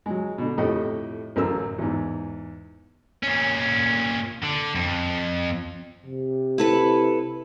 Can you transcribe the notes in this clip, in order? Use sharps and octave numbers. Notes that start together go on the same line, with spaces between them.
F#3 G#3
B2 D3
F2 A2 G4 A4 D#5
A1 F#2 A#4 E6
E2 G#2
A#2 C#4
D3
F2
C3
E4 A4 B4